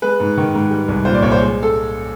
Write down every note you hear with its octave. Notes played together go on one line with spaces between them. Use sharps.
G#3 B4
G#2
D#3
G#2
G3
C2
A#2 C5
D5
C2 C#5
C5
G#3
A4